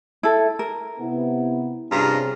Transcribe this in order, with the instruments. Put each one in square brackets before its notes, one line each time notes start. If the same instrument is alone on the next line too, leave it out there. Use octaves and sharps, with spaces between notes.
[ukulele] E4 A4
A#4
[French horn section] C3 B3 E4
[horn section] G2 F4 A#5 [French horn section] C3 C#4 G#4